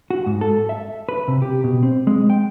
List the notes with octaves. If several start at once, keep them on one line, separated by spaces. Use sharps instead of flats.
F#4
G#2
A4
E5
B4
C3
G4
B2
C4
G#3
G5